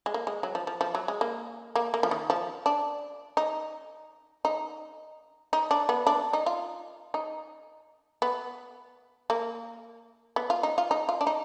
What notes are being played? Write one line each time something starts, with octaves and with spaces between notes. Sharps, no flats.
G#3
A#3
G#3
F#3
F3
F3
F3
F#3
G#3
A#3
A#3
A#3
F3
D#3
F3
D4
D#4
D#4
D#4
D4
B3
D4
D#4
F4
D#4
B3
A#3
B3
F4
D#4
F4
D#4
F4
D4
D#4